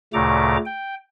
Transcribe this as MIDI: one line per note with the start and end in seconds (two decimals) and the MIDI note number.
0.13 0.57 38
0.13 0.57 46
0.13 0.57 49
0.13 0.57 57
0.13 0.57 82
0.13 0.57 86
0.65 0.95 79